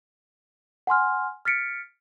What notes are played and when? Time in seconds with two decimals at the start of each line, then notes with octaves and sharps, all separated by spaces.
0.87 F#5 G#5 C6 F6
1.45 F6 A6 B6 C#7 D7